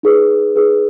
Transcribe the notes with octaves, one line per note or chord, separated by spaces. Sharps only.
D#4 G#4 B4
D#4 G#4 B4